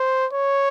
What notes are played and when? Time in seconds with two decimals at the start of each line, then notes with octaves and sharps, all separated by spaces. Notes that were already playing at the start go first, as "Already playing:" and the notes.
Already playing: C5
0.33 C#5